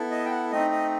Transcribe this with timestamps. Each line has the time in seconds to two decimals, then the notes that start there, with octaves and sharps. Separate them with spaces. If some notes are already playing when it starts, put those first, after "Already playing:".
Already playing: B3 E4 A4
0.11 D#5
0.26 G5
0.31 F#5
0.52 A3 C4 D#4 D#5
0.72 D#5